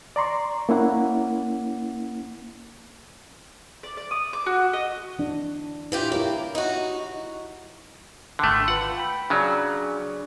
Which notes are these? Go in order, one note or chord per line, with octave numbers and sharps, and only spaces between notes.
D5 A#5 C6 C#6
A#3 C#4 E4 F#5
D5
D5
D#6
D6
F#4
D#5
E3 D4
E3 E4 F4 G4
A#3 E4 G4 C#5
D#4 F#4
G#1 D3 A3 G5 C6
F4 B4 F#5
G5 B5
C#3 F#3 D4 G#4 D5